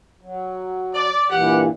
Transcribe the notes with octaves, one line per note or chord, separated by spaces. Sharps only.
F#3
D5
G2 A#2 E3 G4 F#5